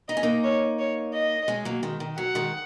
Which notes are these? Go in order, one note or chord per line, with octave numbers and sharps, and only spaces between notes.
D#4 D#5
C#4
A#3 D#4
C#5
C#5
D#5
G#3 C#4
F#3 A#3
D#3 G#3
D#3
F#3 F#5
D#3 G#3